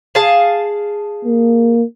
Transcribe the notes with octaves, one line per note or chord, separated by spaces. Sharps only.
G#4 F5 A5
A#3